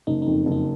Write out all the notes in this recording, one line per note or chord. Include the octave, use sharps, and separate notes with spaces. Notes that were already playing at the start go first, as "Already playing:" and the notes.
F#1 D#4
F2 D#4
F#1
D#4